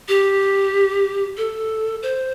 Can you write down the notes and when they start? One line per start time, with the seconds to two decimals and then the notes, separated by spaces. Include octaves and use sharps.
0.08 G4
1.38 A4
2.03 C5